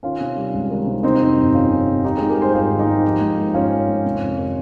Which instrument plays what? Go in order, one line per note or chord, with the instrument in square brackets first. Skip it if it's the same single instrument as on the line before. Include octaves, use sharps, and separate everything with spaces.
[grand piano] D#3 C#4 F4
C3
G3
C#2
D#3
C3
C3 C4 D#4
F2
G1
G1 C#4 F4
C3
F2
D#3 D#4 G4
G#2 F4 G#4
G4 A#4
G3 G#4 C5
G#1 F4 G#4
D#3
D#4 G4
G#2
F3
G#2
A#3
G#1 C#4 F4
F3
G#2
C3
F2
D#3